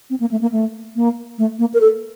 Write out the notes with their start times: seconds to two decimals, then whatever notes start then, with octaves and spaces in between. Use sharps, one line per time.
0.10 C4
0.20 A#3
0.31 A3
0.41 A#3
0.52 A3
0.95 A#3
1.38 A3
1.59 A#3
1.74 A#4
1.81 A4